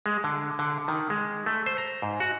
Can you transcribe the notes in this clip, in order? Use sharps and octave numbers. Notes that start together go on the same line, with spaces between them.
G#3
D3
D3
D#3
G#3
A3
C5
A#5
G#2
F#4